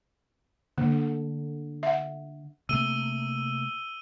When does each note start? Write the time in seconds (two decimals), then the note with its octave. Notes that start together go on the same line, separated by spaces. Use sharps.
0.78 D3 A#3
1.83 E5 F#5
2.69 C3 A3 A#3 E6 D#7 G7